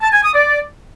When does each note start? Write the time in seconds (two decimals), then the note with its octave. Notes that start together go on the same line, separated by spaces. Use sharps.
0.01 A5
0.12 G#5
0.23 D#6
0.34 D5